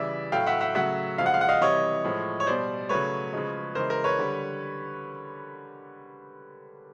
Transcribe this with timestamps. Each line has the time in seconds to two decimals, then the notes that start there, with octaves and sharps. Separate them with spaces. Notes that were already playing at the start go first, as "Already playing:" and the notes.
Already playing: C#3 E3 G3 D5 E5
0.32 A2 F#3 A3 F5 G5
0.47 E5 F#5
0.60 E5 F#5
0.75 C#3 F#3 A3 E5 F#5
1.18 C#3 F3 G#3 F5
1.26 F#5
1.34 F5
1.41 F#5
1.49 D#5 F5
1.61 C3 E3 G3 C#5 D#5
2.04 A2 F3 G#3
2.40 C#5
2.47 B2 G3 C5 D5
2.89 C#3 F#3 A3 B4 C#5
3.33 C#3 F3 G#3
3.75 C#3 E3 G#3 A#4 C5
3.90 A#4 C5
4.04 B4 C#5
4.19 D3 G3